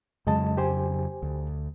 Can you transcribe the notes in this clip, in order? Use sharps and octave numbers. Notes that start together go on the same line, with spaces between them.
F2 C#3 F#3 G#3 D#5 A5
G4 C5 G#5
D2